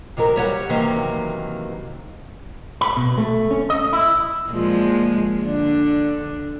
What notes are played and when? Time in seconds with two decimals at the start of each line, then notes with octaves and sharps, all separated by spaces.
0.17 C3 D#3 F#3 A#4
0.36 G3 C#5 D#5 F#5
0.69 C3 D#3 E3 F#3 A#3 C#4
2.81 B5
2.97 B2
3.18 A3
3.51 C#4
3.70 D#5
3.93 E4
4.49 A#2 F3 G#3
5.42 D3 D4